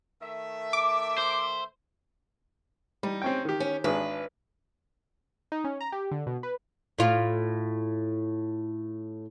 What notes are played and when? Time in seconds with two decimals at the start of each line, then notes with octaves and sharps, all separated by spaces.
0.21 D#3 A3 E5
0.73 D6
1.18 C5
3.03 G3 D#4
3.22 C4 C#4 G5
3.45 D#3 G4
3.60 C#4
3.84 G#1 D4 G#4 B4
5.52 D#4
5.64 C#4
5.81 A#5
5.92 G4
6.11 D3
6.26 B2
6.43 B4
6.99 A2 F4